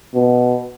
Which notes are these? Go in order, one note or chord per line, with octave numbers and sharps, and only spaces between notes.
B2